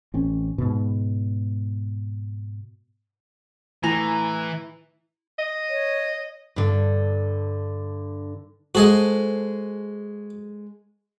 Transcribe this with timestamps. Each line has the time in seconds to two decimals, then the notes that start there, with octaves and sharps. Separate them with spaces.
0.14 A1 C4 C#4
0.58 G#2 B2
3.83 A2 E3 E4 G#5 A#5 F7
5.39 D#5
5.69 C#5
6.56 G2 D3
8.75 G#3 F#4 G#4 A4 C5 D#5